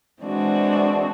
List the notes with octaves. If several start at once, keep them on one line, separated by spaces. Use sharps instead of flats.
E3 G#3 C4 D4 F#4